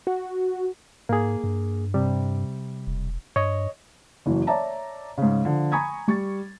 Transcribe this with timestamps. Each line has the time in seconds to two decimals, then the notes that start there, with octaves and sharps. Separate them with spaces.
0.07 F#4
1.09 G#2 A#3 G#4
1.44 G2
1.94 C3 G3
2.87 E1
3.36 G2 C#5 D#5
4.26 F#1 E3 F#3
4.47 C#5 D5 E5 A5 A#5
5.18 G#2 C#3
5.45 D3 F3
5.72 G#5 A#5 B5 C#6 D#6 G#6
6.08 G3 C#6 A6